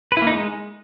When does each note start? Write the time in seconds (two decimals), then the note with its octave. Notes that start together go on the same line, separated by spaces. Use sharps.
0.12 B4
0.17 E4
0.22 A#3
0.27 D#4
0.32 G#3